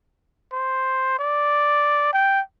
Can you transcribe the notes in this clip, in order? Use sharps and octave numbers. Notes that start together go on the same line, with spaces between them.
C5
D5
G5